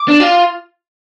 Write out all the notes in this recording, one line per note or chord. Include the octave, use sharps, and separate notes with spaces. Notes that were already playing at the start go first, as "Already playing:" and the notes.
Already playing: D6
D4
F4